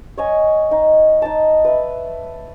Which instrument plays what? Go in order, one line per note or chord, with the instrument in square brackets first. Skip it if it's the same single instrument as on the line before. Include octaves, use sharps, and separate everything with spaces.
[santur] C#5 D#5 G#5
D#4
D#4 D#5 A5
B4 E5